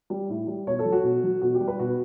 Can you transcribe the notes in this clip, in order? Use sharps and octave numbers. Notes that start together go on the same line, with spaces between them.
G3
A2
G3
B2 C#5
A4
F#3
F#4
B2
F#3
B2 F#4
G4
G3
B4
B2 F#4